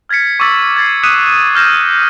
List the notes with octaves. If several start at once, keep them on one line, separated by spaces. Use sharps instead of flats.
F6 G#6 A6 B6 C#7
C#6 D6 E6 A6 B6
G#6 A6 C7
D#6 F#6 B6 C#7 D#7 E7
E6 F6 G6 A#6 E7